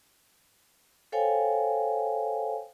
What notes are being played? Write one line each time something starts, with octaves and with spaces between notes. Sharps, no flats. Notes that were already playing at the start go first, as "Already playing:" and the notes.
A4 C5 C#5 F5 G5 G#5